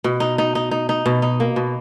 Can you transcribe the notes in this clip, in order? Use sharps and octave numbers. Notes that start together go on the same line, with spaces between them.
B2
D#4
D#4
D#4
D#4
D#4
B2
D#4
A#3
B2